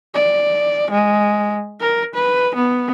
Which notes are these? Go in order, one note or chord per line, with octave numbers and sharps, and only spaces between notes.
D5
G#3
A#4
B4
B3